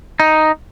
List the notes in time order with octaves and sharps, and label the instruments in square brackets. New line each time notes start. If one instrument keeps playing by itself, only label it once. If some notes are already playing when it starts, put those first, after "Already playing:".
[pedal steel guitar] D#4